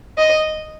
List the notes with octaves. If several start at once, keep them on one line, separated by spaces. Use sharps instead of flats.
D#5